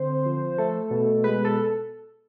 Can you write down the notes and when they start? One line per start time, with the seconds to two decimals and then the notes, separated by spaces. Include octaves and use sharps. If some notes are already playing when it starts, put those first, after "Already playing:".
Already playing: D3 C4 C5
0.25 F3
0.58 A3 A4
0.91 B2
1.24 G#3 B4
1.44 A4